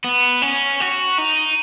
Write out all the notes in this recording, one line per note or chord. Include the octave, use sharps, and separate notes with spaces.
B3
C#4
F#4
D#4